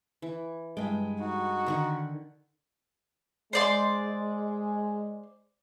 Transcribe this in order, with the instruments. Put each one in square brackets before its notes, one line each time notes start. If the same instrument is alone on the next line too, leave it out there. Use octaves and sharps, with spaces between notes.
[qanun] E3
[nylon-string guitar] G2 G#3 [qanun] G5
[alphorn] D#4 [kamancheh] F#4
[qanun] D3 D#3 F#5
[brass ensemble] G#3 [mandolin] C5 D5 C6